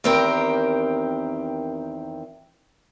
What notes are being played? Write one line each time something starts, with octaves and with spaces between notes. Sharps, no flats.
E2 D#3 C4 G4 A#4 G5